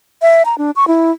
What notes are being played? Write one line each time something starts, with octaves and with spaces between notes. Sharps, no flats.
E5
A#5
D4
C#6
E4